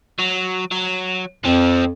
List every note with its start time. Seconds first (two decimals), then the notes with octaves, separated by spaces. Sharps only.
0.19 F#3
0.72 F#3
1.45 F2 F3 C4